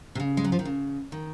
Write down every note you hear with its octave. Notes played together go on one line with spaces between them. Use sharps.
C3
C#3
G#3
F#3
F3
D#3
C#3
D#3